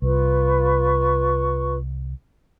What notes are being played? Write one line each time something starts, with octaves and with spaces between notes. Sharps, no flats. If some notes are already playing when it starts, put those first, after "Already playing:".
C2 F4 B4 C#6